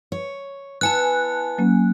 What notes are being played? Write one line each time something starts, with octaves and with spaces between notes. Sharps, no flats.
C#5
B3 E4 G#5 A5 F#6
F#3 A#3 C#4